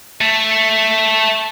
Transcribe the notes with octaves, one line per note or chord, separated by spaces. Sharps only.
A3